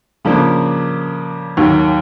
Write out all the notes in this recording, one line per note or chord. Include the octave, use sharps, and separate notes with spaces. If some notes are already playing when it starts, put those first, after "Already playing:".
C#3 F3 A#3 D4
D#2 D#3 F#3